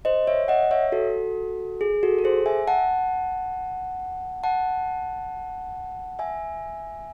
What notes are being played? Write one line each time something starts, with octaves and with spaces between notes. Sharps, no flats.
C5 D#5
C#5 E5
D#5 F#5
C#5 E5
F#4 A4
G#4
F#4 A4
A4
G#4 C5
E5 G#5
F#5 A5
F#5 A5
E5 G#5